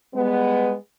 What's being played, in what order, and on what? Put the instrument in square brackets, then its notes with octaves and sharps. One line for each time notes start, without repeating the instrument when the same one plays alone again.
[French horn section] G3 G#3 B3